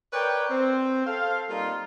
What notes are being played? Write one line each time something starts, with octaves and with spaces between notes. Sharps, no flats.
A#4 B4 C#5 D5 G5
C4
A4 C5 F5
G3 A#3 D#4 F4